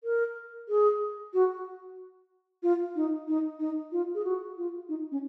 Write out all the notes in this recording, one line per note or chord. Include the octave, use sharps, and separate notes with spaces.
A#4
G#4
F#4
F4
D#4
D#4
D#4
F4
G#4
F#4
F4
D#4
C#4